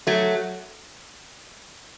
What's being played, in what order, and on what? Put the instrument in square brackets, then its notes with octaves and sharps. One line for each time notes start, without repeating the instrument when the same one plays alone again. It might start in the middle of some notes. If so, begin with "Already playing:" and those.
[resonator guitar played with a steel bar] F#3 A3